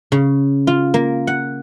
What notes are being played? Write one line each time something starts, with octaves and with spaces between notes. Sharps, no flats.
C#3
F4
A#3
F#5